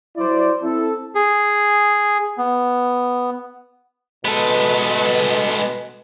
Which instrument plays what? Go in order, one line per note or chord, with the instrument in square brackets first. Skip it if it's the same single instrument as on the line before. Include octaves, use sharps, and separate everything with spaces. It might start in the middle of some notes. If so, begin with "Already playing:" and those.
[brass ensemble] F#3 E4 C5 D5
C4 E4 A4
[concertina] G#4
B3
[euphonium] B2 [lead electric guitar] G#3 [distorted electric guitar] B3 A4